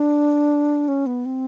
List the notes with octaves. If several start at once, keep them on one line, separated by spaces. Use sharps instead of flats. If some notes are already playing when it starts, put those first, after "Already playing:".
Already playing: D4
C#4
B3
C4